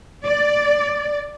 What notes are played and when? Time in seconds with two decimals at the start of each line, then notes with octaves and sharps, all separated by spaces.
0.24 D5